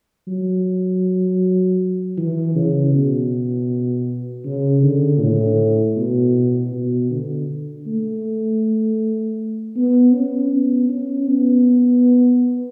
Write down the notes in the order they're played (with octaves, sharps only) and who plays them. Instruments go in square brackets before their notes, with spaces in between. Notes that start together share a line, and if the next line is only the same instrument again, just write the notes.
[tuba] F#3
E3
C#3
B2
C#3
D3
A2
B2
B2
D3
A3
B3
C#4
B3
C#4
B3